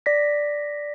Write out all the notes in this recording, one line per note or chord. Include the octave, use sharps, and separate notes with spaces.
D5 A#6 B6